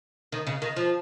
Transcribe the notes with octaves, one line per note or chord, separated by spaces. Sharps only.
D#3
C#3
D#3
F3